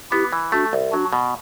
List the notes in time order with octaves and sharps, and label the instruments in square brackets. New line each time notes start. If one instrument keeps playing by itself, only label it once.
[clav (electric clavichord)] B3 [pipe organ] E4 G4
[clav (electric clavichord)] E3
[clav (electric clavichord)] A3 [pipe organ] D4 F#4
[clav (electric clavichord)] C2
[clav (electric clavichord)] F#3 [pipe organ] D4 F#4
[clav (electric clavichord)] B2